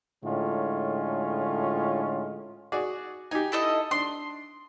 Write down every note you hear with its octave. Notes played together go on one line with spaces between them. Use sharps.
A2 D3 G#3 C#4 F4
F#4 G#4 D5
D#4 G4 G#5
E4 A4 D#5
D4 C6